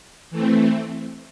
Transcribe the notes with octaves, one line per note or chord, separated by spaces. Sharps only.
E3 A3 C4